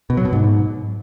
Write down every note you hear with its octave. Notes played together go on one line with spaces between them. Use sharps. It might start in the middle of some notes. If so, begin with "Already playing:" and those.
B2
F#3
B2
G#2